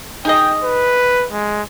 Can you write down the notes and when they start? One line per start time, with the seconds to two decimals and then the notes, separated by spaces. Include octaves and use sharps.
0.25 D#4 G#4 D#5 G5
0.64 B4
1.32 G#3